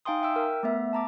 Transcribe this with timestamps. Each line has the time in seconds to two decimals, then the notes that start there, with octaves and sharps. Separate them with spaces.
0.05 D#4 F5 G5 G#5 C6 D#6
0.22 E5 G5 E6
0.36 A#4
0.63 A3 B3 E5
0.93 A5 A#5 D6